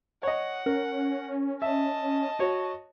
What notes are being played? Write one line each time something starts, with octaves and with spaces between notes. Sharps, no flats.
C#5 D#5 F#5
C#4 A#4
D#5 E5 A5
F#4 C#5